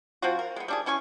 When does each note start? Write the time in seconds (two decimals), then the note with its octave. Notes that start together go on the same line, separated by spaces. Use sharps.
0.22 F3 C4 F4 F#4
0.39 A#4
0.56 G#3 B3
0.68 G3 D4 G#4
0.86 E3 C#4 G#5 C#6